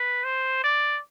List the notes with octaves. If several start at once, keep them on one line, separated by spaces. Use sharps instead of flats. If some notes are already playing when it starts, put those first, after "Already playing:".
Already playing: B4
C5
D5